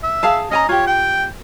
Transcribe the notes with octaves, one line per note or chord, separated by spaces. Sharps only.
E5
G#4 F5 A5
C#4 D#5 G#5 A#5
F4 G4 C#5
G5